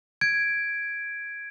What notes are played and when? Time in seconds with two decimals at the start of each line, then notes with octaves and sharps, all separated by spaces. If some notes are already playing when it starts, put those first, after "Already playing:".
0.21 G#6 D7